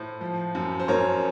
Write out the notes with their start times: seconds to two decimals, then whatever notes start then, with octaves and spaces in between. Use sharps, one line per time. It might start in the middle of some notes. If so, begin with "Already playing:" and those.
Already playing: A2 C5
0.21 F3
0.55 F#2
0.80 C5
0.88 F#2 A#4 C#5